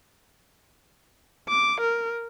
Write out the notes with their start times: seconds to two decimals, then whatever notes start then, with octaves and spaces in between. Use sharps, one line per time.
1.49 D6
1.81 A#4